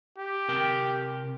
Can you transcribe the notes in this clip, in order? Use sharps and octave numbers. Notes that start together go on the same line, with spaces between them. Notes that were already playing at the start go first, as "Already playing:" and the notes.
G4
C3 A#4 G5